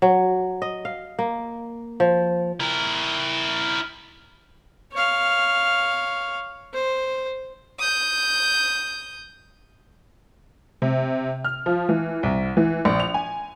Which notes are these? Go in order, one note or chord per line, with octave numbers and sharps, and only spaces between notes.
F#3
D#5
F5
A#3
F3
E4 A#4
C#5 F5
C5
D#6 G6
C3
F6
F3
E3
C2
E3
A#1
F7
G#5